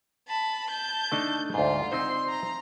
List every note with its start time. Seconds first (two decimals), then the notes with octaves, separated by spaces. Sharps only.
0.28 A5 B5
0.69 A5 G6
1.12 A3 D4 D#4
1.54 D2 G#2 F4
1.92 C4 D#4 C5 C6
2.29 A#5